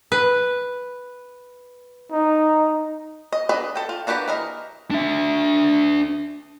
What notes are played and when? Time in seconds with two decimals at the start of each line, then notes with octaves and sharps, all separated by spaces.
0.12 B4
2.11 D#4
3.32 D#5
3.49 D4 G#4 B4 D#5
3.75 A4 G5
3.89 F4
4.07 A#3 D4 F#4 G4 B4
4.28 E3 A#4 D#5
4.91 D4 E5